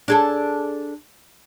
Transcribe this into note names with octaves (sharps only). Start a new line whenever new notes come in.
D4 G#4 A4